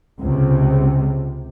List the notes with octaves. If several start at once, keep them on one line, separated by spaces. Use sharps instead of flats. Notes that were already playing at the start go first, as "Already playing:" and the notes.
C#2 C3